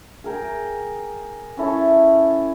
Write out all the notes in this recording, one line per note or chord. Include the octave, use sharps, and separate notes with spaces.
G#4 A#4 G5
C#4 E4 A4 C#5